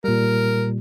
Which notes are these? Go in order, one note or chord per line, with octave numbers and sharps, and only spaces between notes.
A#2 G3 A#4